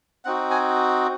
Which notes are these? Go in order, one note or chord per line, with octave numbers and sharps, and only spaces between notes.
C4 D#4 F#4 F#5
G#5